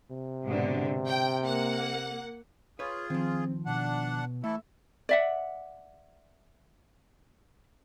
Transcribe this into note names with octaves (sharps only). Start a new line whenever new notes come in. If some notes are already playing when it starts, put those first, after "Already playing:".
C3
G#2 B2 D3
G5
A#3 F#5
F4 G#4 B4 C#5
D#3 F3 C4
B2 D4 F#5
E3 A3 E4 A4 E5
D5 E5 F#5